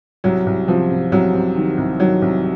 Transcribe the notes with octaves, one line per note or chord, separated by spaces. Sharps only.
C2 F#3
C2
C3 F3
C3
C2 F#3
C3
D#3
C2
D#3 F#3
C2